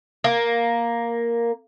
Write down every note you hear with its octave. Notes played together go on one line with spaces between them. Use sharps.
A#3